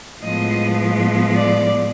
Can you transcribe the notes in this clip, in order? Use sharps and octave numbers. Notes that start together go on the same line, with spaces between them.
A2 F3 G#3 B3 D#5
D5